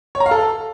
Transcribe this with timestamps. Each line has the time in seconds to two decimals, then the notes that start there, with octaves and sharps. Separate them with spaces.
0.15 C#5
0.20 A#5
0.26 F5
0.31 A4